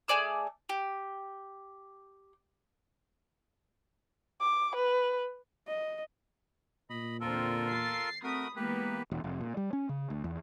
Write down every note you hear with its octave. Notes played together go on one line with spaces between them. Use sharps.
A3 G#4 D5 E6
G4
D6
B4
D#5
A#2 D#5 B5
E2 D3 C4 F4 A4 A#4
A6 C7
A3 C4 F#4 A#4 B5 D#6
E3 G#3 A#3 B3 G4 B4
D#1
F1
A#2
G3
C#4
C#3
D2
E2